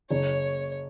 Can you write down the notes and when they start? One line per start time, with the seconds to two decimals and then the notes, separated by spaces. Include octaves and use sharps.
0.10 F#1 C#5